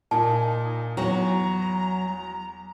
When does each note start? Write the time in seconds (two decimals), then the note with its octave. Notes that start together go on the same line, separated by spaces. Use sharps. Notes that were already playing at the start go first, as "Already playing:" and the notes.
0.11 A#2 D#4 G#5 A5
0.97 E2 F#3 A#5